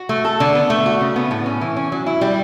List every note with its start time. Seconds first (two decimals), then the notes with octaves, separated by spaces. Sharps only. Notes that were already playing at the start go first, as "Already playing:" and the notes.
Already playing: F#4
0.09 A3
0.25 A4
0.40 D3
0.55 B3
0.70 A3
0.86 F#4
1.01 C#3
1.16 B3
1.31 A2
1.46 C#4
1.61 E3
1.76 C#4
1.92 F#3
2.06 E4
2.21 G3